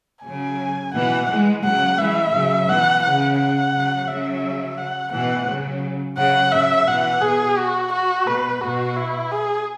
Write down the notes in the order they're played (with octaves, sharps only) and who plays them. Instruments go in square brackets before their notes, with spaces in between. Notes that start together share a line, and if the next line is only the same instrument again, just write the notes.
[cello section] C#3 F#3 [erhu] G#5
[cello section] B2 E3 [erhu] F#5
[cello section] E3 G#3
[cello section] C#3 F#3 [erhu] F#5
[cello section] E3 G#3 [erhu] E5
[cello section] C#3 F#3
[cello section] B2 E3 [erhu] F#5
[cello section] C#3 [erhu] F#5
[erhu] F#5
[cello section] C#3 F#3
[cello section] C#3 F#3 [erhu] E5
[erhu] F#5
[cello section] B2 E3 [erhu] F#5
[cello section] C#3 F#3
[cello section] C#3 F#3 [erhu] F#5
[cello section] C#3 F#3 [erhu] E5
[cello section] B2 E3 [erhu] F#5
[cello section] B2 [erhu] G#4
[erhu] F#4
F#4
[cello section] B2 [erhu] B4
[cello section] B2 [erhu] F#4
[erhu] E4
G#4